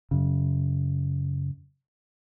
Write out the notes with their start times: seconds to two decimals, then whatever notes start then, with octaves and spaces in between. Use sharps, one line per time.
0.11 F#2 C#3